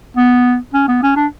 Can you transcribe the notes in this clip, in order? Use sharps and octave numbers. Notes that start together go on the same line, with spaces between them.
B3
C#4
B3
C#4
D4